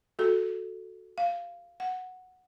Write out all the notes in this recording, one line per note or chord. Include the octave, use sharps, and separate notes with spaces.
F#4 A4
F5
F#5